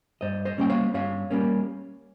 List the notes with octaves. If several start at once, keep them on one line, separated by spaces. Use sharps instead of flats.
G2 C5 D#5
C5 D#5
G3 A#3 C#4 G5
C#5 F5
G2 C#5 F5
G3 A#3 C#4